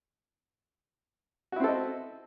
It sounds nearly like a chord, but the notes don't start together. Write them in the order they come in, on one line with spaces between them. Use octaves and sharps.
F#4 E4 C4 A4 D#5